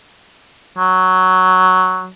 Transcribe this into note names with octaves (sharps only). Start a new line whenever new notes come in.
F#3